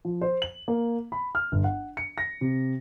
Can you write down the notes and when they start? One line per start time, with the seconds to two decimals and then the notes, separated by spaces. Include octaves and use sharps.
0.05 F3
0.21 C5
0.42 F#7
0.68 A#3
1.12 B5
1.35 F6
1.52 G1
1.64 F#5
1.97 C#7
2.18 A#6
2.41 C3